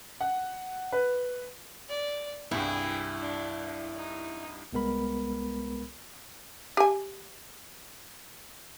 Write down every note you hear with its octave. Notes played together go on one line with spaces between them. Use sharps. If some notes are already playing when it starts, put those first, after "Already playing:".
F#5
B4
D5
C2 G2 E4 G#4 G5
D4
D#4
C2 G#3 B3 A#4 B5
G4 G#5